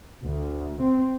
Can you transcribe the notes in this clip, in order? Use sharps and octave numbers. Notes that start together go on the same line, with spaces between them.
D2
C4